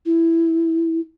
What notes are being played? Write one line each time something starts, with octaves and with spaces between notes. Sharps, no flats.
E4